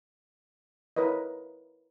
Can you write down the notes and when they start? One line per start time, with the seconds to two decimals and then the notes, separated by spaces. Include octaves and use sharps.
0.97 E4 A#4 B4 C#5 D#5